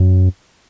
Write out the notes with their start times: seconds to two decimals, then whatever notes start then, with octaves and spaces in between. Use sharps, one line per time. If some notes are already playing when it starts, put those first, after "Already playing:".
Already playing: F#2